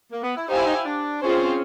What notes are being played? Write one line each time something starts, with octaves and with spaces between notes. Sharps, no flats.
A#3
B3
E4
D#4 G4 C5 F5 G#5
E4
D#4
E4
D4
C4 C#4 F4 G#4 C5